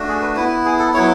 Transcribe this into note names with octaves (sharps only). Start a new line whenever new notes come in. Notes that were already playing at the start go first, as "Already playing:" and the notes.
Already playing: A3 D4 F#4
G#4
B4
B3 E4 B4
G#4
A4
F#3 B3 E4 C#5